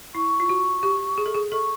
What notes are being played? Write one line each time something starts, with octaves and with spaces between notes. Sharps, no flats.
E4 C#6
F4
F#4
G4
G#4
A4
G#4
A4 C#6